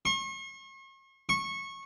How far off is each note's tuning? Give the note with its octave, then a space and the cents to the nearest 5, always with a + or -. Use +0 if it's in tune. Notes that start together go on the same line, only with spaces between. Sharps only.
C#6 -45
C#6 -20